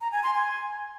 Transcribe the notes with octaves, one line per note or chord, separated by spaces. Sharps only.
A#5
G#5
C6
G#5